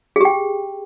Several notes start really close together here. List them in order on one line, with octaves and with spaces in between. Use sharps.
G#4 G4 G5